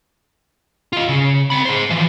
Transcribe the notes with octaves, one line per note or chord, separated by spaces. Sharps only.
F4 D#5
C#3
C4 B5
G#4 C5
E3 F3